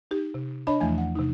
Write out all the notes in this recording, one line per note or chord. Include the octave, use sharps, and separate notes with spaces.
D#4 G4
C3
D4 C#5 D#5 A5 B5
E2 E3 F3 A3 G#5
F#5
C3 D#4